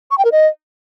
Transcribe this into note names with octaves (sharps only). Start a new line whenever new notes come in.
C#6
G5
A#4
D#5